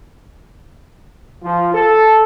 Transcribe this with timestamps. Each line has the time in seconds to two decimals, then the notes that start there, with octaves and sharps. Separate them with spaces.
1.44 F3
1.74 A4